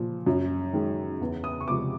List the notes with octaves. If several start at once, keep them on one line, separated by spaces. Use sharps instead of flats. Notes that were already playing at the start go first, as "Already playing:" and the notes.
Already playing: A#2 F3
F#2
D#3 G#3
E2
D#6
C#6
C3 F3 G#3 D6